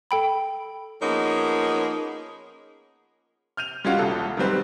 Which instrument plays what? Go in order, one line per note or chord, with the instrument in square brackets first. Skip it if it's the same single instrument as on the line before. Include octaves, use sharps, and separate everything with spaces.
[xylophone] A4 G5 B5
[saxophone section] F3 A#3 B3 C#4 D#4 G#4
[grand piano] F6 G6 D#7 F7
G3 G#3 C#4 F4 F#4
D#1 C2 A4
D#3 F#3 G3 C4 B4